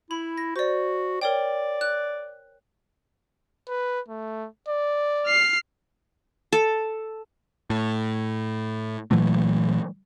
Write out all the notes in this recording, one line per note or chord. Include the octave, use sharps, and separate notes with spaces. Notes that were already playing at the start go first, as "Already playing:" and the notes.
E4 B5
A#6
F#4 C5 D5
A#4 C#5 D5 G5
F#6
B4
A3
D5
F6 C7
A4
A2
A#2 E3 F#3 A3